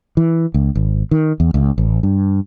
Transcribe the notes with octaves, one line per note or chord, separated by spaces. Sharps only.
E3
C#2
G#1
D#3
E2
C#2
A1
G2